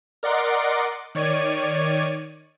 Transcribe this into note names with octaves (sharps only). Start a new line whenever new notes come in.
A#4 D5 D#5 F#5 C6 D6
D#3 C#5 D5 G#6 D#7